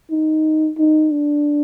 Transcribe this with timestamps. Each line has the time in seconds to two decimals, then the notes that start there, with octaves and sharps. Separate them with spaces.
0.11 D#4
0.78 D#4
1.11 D4